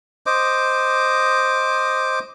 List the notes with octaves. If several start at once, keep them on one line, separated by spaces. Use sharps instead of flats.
C5 D#5 D6